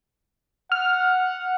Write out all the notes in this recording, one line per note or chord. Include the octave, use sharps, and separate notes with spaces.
F#5 F6